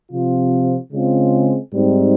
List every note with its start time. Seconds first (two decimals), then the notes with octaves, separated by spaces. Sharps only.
0.11 C3 F3 C4 F4
0.92 C#3 G#3 C4 F4
1.74 G#2 G3 C4 D#4